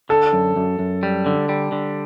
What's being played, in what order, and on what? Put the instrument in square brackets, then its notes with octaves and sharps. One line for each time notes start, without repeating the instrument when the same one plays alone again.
[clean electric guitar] D3 [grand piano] A4
[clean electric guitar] F#2
F#2
F#2
G3
D3
G3
D3